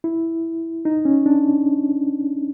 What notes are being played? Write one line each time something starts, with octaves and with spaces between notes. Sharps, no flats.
E4
D#4
C#4
D4